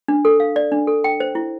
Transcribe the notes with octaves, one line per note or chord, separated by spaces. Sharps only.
D4
A4
F5
D5
D4
A4
G5
C5
E4